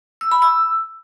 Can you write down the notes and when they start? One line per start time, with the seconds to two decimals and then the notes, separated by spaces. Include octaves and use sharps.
0.21 E6
0.32 B5
0.42 E6